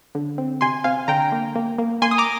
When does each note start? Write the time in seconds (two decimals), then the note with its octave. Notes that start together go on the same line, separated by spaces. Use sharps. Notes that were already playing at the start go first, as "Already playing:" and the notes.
0.15 D3
0.38 C4
0.61 C3 G#5 C6
0.84 C3 F5 G#5
1.08 D3 G5 A#5
1.32 A#3
1.55 A#3
1.79 A#3
2.02 A#3 G#5 C6
2.11 D#6
2.18 A#5 D6